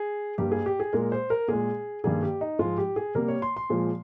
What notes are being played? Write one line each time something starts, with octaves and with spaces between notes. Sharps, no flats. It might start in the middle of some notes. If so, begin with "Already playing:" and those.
Already playing: G#4
G2 G3 A#3 G4
G#4
G4
G#4
A#2 G#3 A#4
C5
A#4
A#2 G#3 G#4
G2 D#3 G3 A#3 G#4
G4
D#4
G#2 F3 G#3 F4
G4
G#4
C3 G3 A#3 A#4
C#5
C6
C6
A#2 F3 G#3